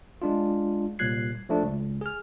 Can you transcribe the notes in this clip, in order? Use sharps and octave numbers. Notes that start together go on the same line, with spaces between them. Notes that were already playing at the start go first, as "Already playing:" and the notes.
G#3 D4 F4
C2 A#2 F#6 G#6 C7
F3 A3 D4
C#2
G#4 F6